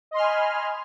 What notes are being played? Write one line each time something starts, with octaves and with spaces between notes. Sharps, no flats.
D#5 G#5 B5 C6 F6